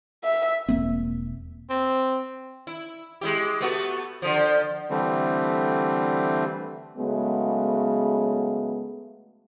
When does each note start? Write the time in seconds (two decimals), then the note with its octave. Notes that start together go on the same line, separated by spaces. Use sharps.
0.24 E5
0.68 E1 A#3 C4
1.70 C4
2.67 E4
3.21 G#3 E4 G4
3.61 A3 B3 F#4
4.22 D3 F3
4.90 D3 E3 G3 A3 C4
6.97 C#3 F#3 G#3 A3 B3